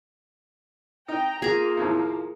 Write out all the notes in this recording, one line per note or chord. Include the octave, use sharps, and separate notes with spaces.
D#4 G5 A#5
A#3 F4 G#4 A#5
D#2 A2 F3